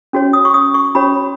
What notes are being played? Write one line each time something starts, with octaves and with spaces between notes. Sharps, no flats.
C#4 F#4 C#5
D#6
C#6
D#6
C#6
C#4 F#4 C#5 B5